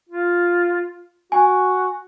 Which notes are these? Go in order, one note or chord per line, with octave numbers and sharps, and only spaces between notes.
F4
F#4 G#5